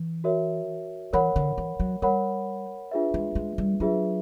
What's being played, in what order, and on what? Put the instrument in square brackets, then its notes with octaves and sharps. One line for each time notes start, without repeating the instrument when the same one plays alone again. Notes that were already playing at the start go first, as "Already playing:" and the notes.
Already playing: [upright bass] E3
[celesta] F#4 A#4 C#5 E5
[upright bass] E3 [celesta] A#4 C#5 F#5 B5
[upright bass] D3
E3
F#3
[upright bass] G3 [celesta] A#4 C#5 F#5 B5
[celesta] D4 F4 G#4 B4 E5
[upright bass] G#3
G#3
G3
[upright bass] F#3 [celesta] D4 F4 G#4 B4 E5